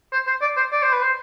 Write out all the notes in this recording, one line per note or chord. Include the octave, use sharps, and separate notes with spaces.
C5
C5
D5
C5
D5
C5
B4
C5